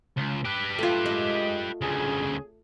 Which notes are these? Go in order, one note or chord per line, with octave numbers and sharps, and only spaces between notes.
C#2
G4 B4
A3 F4
G#3 D#5
D2 C#3 G#4